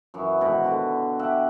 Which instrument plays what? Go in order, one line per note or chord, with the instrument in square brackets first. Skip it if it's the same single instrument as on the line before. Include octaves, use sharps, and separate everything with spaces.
[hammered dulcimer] F#2 E3 F#3
G#2 B2 D#3
D3 F#4
G4 E5 F#5 A5